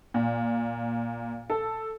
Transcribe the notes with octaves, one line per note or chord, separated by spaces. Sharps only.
A#2
A4